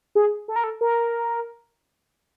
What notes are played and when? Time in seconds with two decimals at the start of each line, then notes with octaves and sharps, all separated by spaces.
0.15 G#4
0.48 A4
0.56 A#4
0.64 A4
0.81 A#4